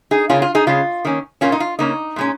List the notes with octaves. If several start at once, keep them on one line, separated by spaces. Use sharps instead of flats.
D#4 G#4
C#3 A#3 C#4 F4
F4
D#4 G#4
C#3 G#3 C#4 F4
D#3 A#3 C#4
A#2 A#3 C#4 F4
D#4
F4
C#3 A#3 C#4 D#4
A#2 G#3 C#4